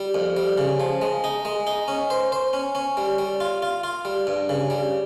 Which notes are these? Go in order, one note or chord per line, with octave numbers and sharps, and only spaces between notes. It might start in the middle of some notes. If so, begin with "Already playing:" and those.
Already playing: G3
F2
G3
C#3
F3
G#3
D#4
G#3
D#4
C#4
C5
C5
C#4
C#4
G3
G3
F4
F4
F4
G3
G2
C#3
G3